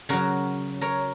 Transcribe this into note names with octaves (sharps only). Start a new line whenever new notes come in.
C#3 F#3 F#4 A#4
A#4 C#5